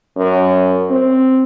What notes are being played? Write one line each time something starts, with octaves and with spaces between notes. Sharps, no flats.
F#2
C4